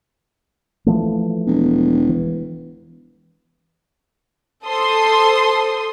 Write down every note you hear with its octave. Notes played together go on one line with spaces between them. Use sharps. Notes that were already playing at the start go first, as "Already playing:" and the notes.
E3 F3 A3
E1
E3
A4 C5 C6 D#6